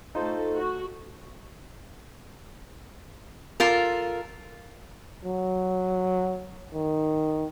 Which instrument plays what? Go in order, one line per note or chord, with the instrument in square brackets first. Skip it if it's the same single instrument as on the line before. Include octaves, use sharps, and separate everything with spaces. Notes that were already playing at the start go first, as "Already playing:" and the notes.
[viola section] A3 A4 [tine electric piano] D#4 F4 C5
[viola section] F#4
[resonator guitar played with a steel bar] F4 A4 A#4
[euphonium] F#3
D#3